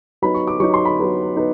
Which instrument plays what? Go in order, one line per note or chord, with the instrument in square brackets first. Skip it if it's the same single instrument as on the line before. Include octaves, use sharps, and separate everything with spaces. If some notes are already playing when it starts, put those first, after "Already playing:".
[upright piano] F#3 B3 D#4 B5
C#6
D6
F#3 B3 D#4 C#6
C6
B5
F#3 B3 D#4
B3 D#4